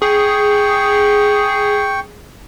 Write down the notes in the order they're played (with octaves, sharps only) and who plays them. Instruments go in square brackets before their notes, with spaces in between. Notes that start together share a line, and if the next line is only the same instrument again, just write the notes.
[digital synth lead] G#4 [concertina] G5 C#6